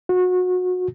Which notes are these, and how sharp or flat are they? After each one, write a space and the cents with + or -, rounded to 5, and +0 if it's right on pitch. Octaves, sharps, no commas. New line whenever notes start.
F#4 -25